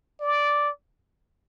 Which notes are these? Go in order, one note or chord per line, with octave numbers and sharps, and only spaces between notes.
D5